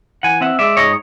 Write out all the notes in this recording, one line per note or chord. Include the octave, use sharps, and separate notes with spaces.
E3 F#5 G#5
C4 E5 F#5
G#3 D5 E5
G#2 C#5 D#5